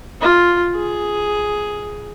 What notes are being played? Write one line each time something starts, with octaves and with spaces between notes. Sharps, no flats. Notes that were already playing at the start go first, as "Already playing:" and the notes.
F4
G#4